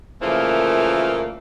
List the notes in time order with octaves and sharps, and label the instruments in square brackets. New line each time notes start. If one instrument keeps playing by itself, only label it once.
[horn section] A#2 C#3 E3 F3 A3 A#3